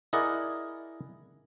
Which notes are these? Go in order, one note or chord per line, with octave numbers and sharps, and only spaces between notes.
E4 G#4 A#4 D5 D#5 F#5